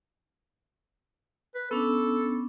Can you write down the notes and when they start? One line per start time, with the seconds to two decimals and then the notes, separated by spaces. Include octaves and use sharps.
1.55 B4
1.71 B3 C#4 D4 A4